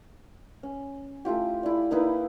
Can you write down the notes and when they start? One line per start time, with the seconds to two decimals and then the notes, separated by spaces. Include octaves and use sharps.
0.63 C#4
1.25 A3 E4 F4 G4
1.63 E4 D5
1.91 A#3 D#4 E4 B4